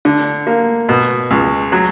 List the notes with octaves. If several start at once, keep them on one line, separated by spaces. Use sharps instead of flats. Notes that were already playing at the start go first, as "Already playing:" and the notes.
D3
A#3
B2
C#2
F#3